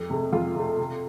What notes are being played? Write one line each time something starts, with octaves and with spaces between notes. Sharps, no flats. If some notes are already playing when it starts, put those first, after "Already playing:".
Already playing: F2
C3 A3
F2 F4
C3 A3
C3